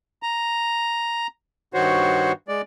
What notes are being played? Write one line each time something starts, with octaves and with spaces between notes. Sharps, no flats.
A#5
G2 D#3 F#4 C5 C#5
G#3 D5